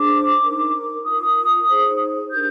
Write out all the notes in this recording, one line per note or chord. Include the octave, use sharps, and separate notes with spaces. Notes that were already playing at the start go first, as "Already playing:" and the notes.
Already playing: D4 G#4 C5 D6
D#4 A#4
F4 A#4 D#6
D#4 G#4 C5
D4 G4 A#4 G6